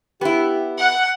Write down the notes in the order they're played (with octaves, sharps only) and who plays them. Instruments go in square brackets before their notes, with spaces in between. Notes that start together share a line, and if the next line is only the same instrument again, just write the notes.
[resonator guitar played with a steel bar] B3 E4 [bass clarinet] G4
[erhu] F#5